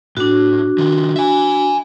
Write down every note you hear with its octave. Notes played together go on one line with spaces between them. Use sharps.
A2 D4 F#4
D#3 F3
E5 G#5